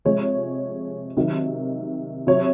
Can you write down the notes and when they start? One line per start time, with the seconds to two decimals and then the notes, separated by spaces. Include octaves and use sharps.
0.05 C3 F3 G#3 C#5
1.17 C3 D#3 F#3
2.27 C3 F#3 C#5